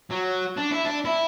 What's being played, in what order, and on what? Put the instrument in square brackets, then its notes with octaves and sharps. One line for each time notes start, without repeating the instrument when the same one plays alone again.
[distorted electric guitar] F#3
D4
E4
D4
E4